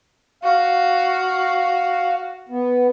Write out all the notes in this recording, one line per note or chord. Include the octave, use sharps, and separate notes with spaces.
F#4 F5
B3